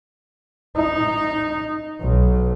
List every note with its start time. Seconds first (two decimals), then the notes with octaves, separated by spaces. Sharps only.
0.76 D#4
2.01 B1